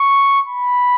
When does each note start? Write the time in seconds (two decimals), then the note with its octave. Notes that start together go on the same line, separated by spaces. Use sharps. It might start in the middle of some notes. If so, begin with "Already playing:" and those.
Already playing: C#6
0.47 B5